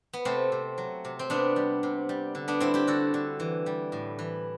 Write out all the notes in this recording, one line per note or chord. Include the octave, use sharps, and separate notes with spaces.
B3
C3 A3 C4
C3
F#3
C3
C4
C3 B3 D4
G3
C3
G3
D3
B3 D4
G3 C4 E4
E4 G4
D3 F#4 A4
D3
E3
G3
A2
E3